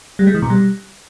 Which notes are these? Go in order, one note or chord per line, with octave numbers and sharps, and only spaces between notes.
G3
G#3
E3
B2
G3